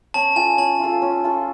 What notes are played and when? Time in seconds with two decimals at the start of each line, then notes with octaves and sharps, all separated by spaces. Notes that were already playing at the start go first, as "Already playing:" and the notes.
0.14 C#4 A5
0.36 F4 A4 G#5
0.58 C#4 A5
0.80 F4 A4
1.02 C#4
1.24 F4 A4